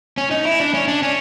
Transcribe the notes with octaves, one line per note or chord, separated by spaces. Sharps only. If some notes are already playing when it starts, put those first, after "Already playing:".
C#4
D#4
E4
D4
C#4
D4
C#4